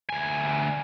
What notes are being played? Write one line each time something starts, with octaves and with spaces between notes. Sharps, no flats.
D2 G#5